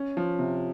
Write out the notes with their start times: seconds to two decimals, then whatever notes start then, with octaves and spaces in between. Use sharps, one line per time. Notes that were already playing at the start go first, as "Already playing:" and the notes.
Already playing: C#4
0.17 F3
0.39 C3